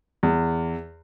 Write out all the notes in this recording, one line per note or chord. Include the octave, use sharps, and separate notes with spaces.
E2